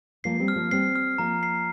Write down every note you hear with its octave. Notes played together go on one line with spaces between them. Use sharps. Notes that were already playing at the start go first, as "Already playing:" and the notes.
F3 A#3 C7
G3 C4
F6
F3 A#3
G3 C4 C7
F6
F3 A#3 A#5
C7